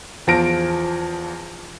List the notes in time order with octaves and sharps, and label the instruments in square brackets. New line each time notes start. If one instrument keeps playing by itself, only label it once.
[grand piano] E2 F3 A5 A#6 D7